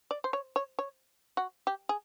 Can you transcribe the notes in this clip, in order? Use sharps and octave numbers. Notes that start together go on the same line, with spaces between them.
D5
C5
C#5
C#5
C#5
F#4
G4
G#4